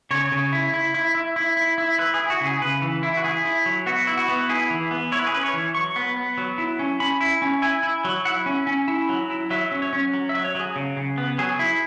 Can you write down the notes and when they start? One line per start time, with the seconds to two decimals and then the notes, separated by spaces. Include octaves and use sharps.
0.11 C#3 C#5
0.32 C#3
0.53 E4
0.74 E4
0.94 E4
1.15 E4
1.36 E4
1.57 E4
1.78 E4
1.99 E4 B4
2.14 G#4
2.19 E4
2.30 F#4
2.41 C#3 G#4
2.61 C#3 B4
2.82 E3
3.03 E4
3.17 F#4
3.24 E4 G#4
3.45 E4
3.66 F#3
3.86 B3 F#4
4.07 E4
4.18 F#4
4.29 B3
4.49 E4 G#4
4.70 E3
4.91 B3
5.12 E4 C#5
5.19 B4
5.27 G#4
5.33 C#4 B4
5.43 C#5
5.53 E3
5.74 F#3 C#6
5.96 B3
6.17 B3
6.38 F#3
6.58 E4
6.79 C#4
7.00 C#4 B5
7.21 E4
7.42 C#4
7.62 E4 G#5
7.83 E4
8.05 F#3
8.25 E4 F#5
8.46 C#4
8.67 C#4
8.88 E4
9.09 F#3
9.30 E4
9.50 F#3 E5
9.72 C#4
9.82 C#5
9.93 C#4
10.14 F#3
10.29 F#3 E5
10.44 C#5
10.55 F#3 G#4
10.76 C#3
10.97 C#3
11.18 B3
11.38 F#3 G#4
11.59 E4